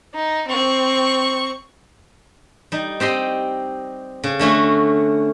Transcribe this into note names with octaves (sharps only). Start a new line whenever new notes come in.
D#4
C4 C#6
G3 D#4
C4 G4 D#5 C6
C#3
D3 A3 C#4 F#4